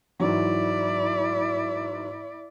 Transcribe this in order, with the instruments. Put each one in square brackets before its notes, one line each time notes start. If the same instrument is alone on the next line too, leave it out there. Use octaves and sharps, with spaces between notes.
[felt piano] G#2 E3 F#3 [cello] E4 D5